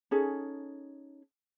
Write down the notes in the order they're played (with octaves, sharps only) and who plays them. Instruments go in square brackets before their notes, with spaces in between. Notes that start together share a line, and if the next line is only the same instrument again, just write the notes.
[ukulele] C#4 D#4 G#4 A4